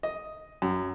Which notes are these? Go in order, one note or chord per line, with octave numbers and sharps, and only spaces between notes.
D#5
F#2